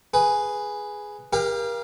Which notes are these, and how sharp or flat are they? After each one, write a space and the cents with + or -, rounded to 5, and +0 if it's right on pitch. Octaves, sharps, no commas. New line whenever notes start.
G#4 +0 B4 +0
G4 +35 A#4 +30 F5 -15